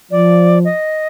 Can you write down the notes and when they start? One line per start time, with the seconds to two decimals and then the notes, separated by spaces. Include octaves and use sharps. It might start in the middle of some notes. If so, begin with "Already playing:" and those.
0.11 F3 D5
0.65 D#5